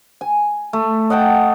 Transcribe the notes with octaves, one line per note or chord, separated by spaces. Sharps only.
G#5
A3
D#5 F#5 G5 A5